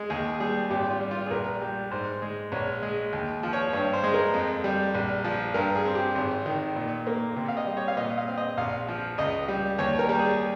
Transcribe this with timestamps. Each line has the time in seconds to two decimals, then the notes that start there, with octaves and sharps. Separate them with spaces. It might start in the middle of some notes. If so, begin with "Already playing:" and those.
Already playing: G#3
0.10 D#2 G#4
0.40 G3 G#4
0.70 G#1 G4
0.91 F4
1.01 G3
1.11 F4
1.26 G#4
1.31 A#1 A#4
1.61 G3
1.91 G#2 C5
2.22 G#3
2.52 A#1 C#5
2.83 G#3
3.13 D#2
3.43 F3
3.53 C#5
3.73 G2 C#5
3.93 C5
4.04 G#3
4.14 A#4
4.34 F2
4.64 G3
4.95 A#1
5.25 F3
5.54 G2 A#4
5.75 G#4
5.85 C4
5.95 G4
6.15 G#1
6.46 D#3
6.76 A#2
7.07 A#3
7.36 C3
7.48 F5
7.57 D#5
7.67 G3
7.77 C#5
7.88 F5
7.97 A#2 D#5
8.18 F5
8.28 C4
8.38 D#5
8.57 A#1 F5
8.88 F3
9.18 C#2 D#5
9.48 G3
9.79 D#2 C#5
9.99 A#4
10.09 G3
10.19 G#4